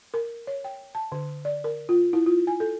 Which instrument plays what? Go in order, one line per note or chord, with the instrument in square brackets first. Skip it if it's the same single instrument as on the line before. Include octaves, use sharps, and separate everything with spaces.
[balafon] A#4
C#5
G5
A5
D3
D5
A#4
F4
E4
F4
G#5
A4